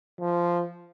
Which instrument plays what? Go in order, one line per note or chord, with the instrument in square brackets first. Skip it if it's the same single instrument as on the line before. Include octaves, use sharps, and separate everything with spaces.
[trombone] F3